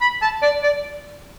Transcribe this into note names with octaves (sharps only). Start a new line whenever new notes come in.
B5
A5
D5
D5